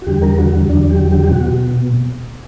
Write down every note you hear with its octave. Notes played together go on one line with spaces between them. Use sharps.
F#4
E2 D3 G3 G4
A#4
F#4
E2 D3 F#3 D4
G4
G4
B2 F#4